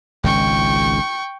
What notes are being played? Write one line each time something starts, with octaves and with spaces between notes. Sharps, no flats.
G#1 C#2 G5 C#6